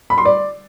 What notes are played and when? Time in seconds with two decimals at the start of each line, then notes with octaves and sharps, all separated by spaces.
0.10 B5
0.18 C6
0.25 D5